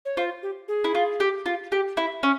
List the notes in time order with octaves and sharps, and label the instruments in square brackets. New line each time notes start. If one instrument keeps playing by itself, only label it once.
[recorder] C#5
[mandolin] F4 [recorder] C5
[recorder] G4
G#4
[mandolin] E4
F4
G4
F4
G4
E4
C#4